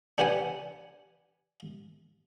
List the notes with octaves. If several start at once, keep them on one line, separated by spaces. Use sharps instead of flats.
D4 G4 B4 F#5 G#5